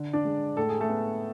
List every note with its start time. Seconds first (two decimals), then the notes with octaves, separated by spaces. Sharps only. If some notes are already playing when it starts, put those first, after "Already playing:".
Already playing: D3
0.13 D4 D5
0.25 G#3
0.57 A2 A4
0.69 G#4
0.80 A3 A4
0.89 B3